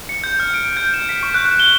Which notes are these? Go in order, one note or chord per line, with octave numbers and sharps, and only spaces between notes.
C#7
G6
F6
D7
G6
E7
B6
C#6
F#6
F#6
G7